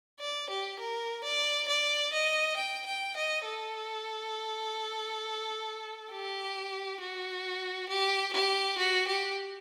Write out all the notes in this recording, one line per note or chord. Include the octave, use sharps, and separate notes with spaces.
D5
G4
A#4
D5
D5
D#5
G5
G5
D#5
A4
G4
F#4
G4
G4
F#4
G4